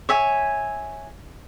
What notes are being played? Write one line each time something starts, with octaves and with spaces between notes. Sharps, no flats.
C#5 E5 G#5